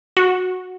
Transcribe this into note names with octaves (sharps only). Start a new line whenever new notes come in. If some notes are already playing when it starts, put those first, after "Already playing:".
F#4